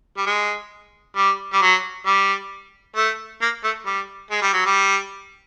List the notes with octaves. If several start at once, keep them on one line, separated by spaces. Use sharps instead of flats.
G3
G#3
G3
G3
F#3
G3
A3
A#3
A3
G3
G#3
G3
F#3
G3